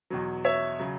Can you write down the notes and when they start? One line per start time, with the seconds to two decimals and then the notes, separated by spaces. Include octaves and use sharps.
0.10 E2 B2 F#3
0.45 C#5 E5
0.79 C#3 F#3